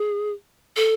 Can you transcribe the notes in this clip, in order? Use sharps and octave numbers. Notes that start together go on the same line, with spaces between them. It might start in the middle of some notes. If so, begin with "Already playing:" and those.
Already playing: G#4
A4